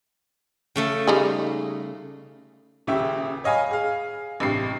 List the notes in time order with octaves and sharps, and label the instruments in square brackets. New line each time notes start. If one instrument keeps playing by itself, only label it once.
[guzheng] C#3 A3 A4
[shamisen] G3 D#4 G#4
[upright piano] D#1 C#3 G4 E5 G5
C#5 D#5 F5 G#5 B5
G#4 F5
A1 G2 C3 C7